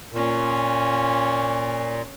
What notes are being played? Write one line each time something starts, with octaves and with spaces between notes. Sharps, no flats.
A#2 A#3 C#4